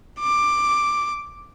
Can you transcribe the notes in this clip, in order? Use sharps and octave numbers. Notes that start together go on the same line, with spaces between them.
D6